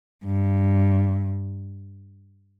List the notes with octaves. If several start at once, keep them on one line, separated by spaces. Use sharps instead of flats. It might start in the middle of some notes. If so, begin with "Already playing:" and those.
G2